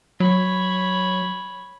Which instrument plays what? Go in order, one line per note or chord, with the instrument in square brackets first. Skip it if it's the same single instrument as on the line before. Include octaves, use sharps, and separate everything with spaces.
[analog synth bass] F#3 [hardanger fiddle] C#5 B5